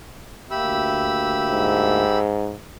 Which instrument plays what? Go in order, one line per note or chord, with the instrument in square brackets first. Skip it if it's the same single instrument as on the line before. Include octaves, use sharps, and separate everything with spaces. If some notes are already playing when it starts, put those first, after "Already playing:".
[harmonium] D2 A#3 E5 [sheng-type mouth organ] G4 B5 E6
[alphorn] G#2